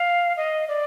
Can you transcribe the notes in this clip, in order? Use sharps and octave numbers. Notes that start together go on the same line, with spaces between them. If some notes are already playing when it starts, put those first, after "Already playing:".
Already playing: F5
D#5
D5